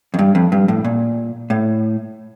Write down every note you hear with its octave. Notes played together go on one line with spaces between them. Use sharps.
F2
G2
F2
G2
A2
A#2
A2